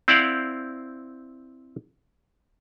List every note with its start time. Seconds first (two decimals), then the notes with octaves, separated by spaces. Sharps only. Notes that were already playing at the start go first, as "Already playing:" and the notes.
0.08 C4 E4 C5 D5 F5 F#5